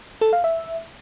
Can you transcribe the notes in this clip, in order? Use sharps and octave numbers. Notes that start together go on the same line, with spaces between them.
A4
F5
E5